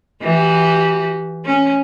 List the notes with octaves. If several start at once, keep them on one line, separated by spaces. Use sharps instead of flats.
E3 F#4 G4
C#4